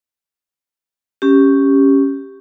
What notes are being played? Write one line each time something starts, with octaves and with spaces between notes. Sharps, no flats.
C#4 G4